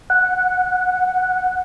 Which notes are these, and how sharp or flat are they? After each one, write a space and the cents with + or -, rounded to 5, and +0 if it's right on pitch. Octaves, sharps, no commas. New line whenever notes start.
F#5 -5